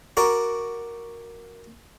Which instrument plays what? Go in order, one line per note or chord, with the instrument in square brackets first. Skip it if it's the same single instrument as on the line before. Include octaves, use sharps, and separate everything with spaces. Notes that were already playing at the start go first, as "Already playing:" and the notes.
[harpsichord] F#4 A#4 D5